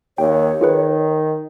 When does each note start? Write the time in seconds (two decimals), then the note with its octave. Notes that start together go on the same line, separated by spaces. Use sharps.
0.18 D#2 C#5 G5
0.61 D#3 F4 G#4 B4